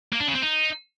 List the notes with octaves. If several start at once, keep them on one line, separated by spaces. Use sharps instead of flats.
A#3
D4
C#3
C4
D#4